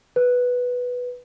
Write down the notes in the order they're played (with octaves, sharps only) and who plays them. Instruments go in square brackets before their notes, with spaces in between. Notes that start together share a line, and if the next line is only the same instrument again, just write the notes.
[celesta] B4